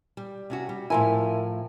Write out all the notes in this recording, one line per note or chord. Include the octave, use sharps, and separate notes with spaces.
G3
C3 C#4 F#4
G3
A2 F3 E4 A#4 E5 G#5